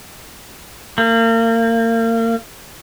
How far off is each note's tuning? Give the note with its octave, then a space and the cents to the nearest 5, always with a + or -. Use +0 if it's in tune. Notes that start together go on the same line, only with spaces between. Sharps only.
A#3 -35